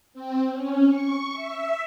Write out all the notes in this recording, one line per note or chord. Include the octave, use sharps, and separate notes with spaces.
C4
C#4
C#6
E5